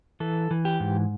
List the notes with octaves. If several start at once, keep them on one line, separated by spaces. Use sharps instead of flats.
E3 A4
E3
G4
G#2